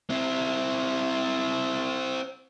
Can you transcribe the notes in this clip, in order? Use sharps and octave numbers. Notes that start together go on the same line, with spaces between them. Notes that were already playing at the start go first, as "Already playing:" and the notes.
C4 E4